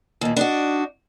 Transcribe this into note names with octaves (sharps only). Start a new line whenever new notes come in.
D#2 A#2
D4 D#4 F#4